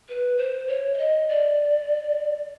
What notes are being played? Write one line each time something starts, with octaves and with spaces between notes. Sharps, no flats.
B4
C5
C#5
E5
D#5
D5